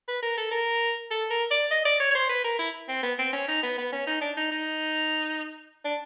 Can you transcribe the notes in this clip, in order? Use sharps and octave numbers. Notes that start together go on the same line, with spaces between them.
B4
A#4
A4
A#4
A4
A#4
D5
D#5
D5
C#5
C#5
C5
B4
A#4
E4
C4
B3
C4
C#4
D#4
B3
B3
C#4
D#4
D4
D#4
D#4
D4